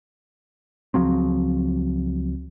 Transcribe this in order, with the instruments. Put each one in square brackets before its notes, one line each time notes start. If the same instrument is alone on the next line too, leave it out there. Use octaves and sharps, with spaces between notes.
[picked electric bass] C#2 F3 F#3 C4